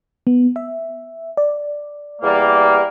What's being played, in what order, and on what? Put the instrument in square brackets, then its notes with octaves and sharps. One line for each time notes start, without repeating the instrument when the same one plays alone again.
[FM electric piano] B3
E5
D5
[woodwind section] E2 G3 A#3